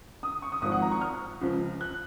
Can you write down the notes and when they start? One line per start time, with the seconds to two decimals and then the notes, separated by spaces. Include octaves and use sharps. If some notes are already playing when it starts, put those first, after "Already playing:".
0.23 D#6
0.42 C#6
0.52 D#6
0.62 G#1 G#2 F3 D#6
0.72 F#5
0.82 A#5
0.91 C#6
1.01 F6
1.41 C#2 C#3 F3
1.81 F#6